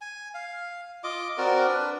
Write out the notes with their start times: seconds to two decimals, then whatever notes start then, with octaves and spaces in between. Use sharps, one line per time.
0.01 G#5
0.34 F5
1.04 F4 D#5 D6
1.38 C4 F#4 A#4 D5
1.67 D4 B4